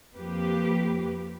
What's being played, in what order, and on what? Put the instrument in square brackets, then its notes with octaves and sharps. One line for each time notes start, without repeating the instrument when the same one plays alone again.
[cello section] F2 F3 A#3 G4 B4